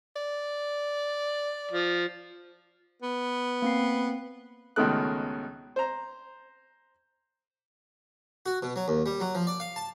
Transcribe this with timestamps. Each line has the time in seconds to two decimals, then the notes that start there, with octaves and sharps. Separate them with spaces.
0.16 D5
1.71 F3
3.02 B3
3.62 A#3 C4 C7
4.76 C#2 B2 D#3 A3 F#6
5.76 C5 A#5
8.46 F#4
8.62 B2
8.76 F#3
8.88 D#2
9.06 G3
9.20 F#3
9.35 F3
9.47 D5
9.60 F5
9.76 A5